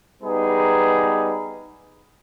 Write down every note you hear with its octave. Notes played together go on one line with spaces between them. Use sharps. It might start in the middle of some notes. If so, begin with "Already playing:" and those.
G3 B3 D#4 G#4 B4